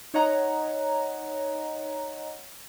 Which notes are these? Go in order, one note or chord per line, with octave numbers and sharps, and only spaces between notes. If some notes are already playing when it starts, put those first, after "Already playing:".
D#4 C#5 D#5 F#5 A#5